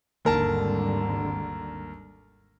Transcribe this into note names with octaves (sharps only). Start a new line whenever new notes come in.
G#1 D#2 D3 G3 A#4 A5